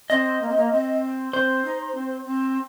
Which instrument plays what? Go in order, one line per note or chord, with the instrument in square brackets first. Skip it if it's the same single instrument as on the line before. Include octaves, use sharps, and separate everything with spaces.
[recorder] C4 [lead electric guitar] D#5
[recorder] A#3
C4
A#3
C4
[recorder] C4 [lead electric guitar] C5
[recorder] D#4
C4
C4